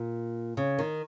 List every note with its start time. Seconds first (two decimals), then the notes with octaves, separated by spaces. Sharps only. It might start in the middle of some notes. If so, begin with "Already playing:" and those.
Already playing: A#2
0.57 C#3
0.79 D#3